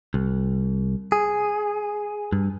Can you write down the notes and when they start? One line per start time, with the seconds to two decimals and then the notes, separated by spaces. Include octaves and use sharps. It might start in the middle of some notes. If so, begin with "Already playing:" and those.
0.14 C2
1.12 G#4
2.33 G2